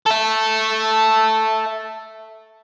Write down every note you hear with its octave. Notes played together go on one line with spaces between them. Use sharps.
A4 E5